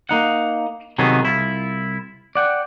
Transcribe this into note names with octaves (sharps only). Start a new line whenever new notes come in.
A#3 D#4 F#5
C3 D#3 F#3 B3 G#4 A4
C2 E4 F4
D5 F#5 G5